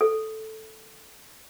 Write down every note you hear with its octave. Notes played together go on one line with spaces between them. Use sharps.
A4